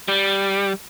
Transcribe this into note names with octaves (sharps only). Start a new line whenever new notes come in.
G3